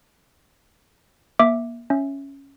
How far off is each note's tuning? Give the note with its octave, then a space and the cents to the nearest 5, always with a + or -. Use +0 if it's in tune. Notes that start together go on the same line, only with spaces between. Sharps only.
A#3 +30 E5 +0 D6 +0
C#4 +0 E5 +0